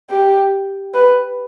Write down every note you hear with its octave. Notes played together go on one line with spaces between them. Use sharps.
G4
B4